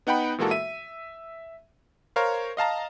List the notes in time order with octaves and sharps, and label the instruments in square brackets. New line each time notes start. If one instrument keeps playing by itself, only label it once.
[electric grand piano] B3 D#4 F#5 G5 B5
A#2 E3 G#3 A#3 F#4 A4
E5 D#7
A#4 C5 C#5 F5
D#5 F5 A5 A#5